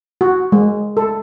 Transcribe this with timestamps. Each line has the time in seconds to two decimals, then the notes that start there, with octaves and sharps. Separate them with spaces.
0.21 F#4
0.52 G#3
0.97 A4